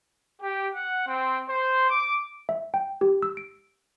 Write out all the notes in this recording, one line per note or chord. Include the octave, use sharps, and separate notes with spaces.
G4
F#5
C4
C5
D6
E5
G5
G4
E6
D7